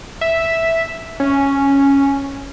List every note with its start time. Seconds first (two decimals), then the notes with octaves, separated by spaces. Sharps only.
0.21 E5
1.20 C#4